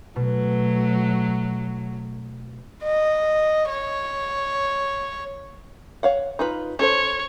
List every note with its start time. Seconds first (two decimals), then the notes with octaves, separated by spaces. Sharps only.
0.16 B2 F#3 A3
2.83 D#5
3.69 C#5
6.03 C#5 F5 F#5
6.39 D#4 F4 B4
6.79 C#4 A4 C5 C#5